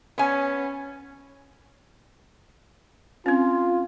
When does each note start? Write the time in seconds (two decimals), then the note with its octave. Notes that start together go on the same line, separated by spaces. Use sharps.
0.18 B3 C#4 G#5
3.26 C4 C#4 F4